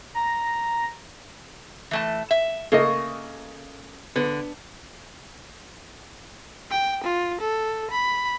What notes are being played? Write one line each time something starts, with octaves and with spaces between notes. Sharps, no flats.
A#5
E3 A3 A5
E5
C#3 A3 A#3 D#5
D3 B3
G5
F4
A4
B5